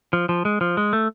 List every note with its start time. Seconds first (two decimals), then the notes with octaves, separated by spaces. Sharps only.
0.13 F3
0.29 F3
0.45 G#3
0.61 F3
0.77 G#3
0.93 A3